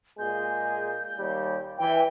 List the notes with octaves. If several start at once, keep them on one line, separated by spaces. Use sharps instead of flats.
A#2 G#3 G#4 G6
D#2 G3
E3 G5